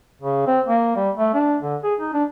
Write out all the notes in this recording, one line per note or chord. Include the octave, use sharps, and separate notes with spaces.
C#3
C4
A#3
G3
A3
D4
D3
G#4
D#4
D4